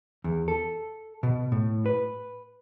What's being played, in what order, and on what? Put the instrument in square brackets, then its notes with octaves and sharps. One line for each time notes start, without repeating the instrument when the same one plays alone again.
[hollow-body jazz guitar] E2
A4
B2
A2
B4